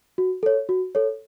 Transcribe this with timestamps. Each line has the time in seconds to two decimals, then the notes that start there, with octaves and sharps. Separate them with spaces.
0.18 F#4
0.43 A4 C#5
0.69 F#4
0.95 A4 C#5